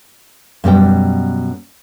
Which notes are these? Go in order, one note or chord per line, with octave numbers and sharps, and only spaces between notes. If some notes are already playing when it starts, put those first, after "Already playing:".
F#2 B2 G3 G5